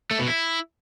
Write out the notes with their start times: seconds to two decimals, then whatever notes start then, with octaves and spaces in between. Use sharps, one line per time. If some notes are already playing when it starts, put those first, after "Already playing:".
0.11 A3
0.19 B2
0.27 E4